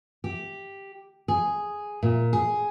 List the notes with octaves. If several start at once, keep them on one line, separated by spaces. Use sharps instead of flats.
G4
G#4
A#2
G#4